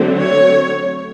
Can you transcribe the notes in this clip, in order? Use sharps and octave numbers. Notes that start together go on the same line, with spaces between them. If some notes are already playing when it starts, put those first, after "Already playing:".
Already playing: D3 F#3 A3 C4
C#5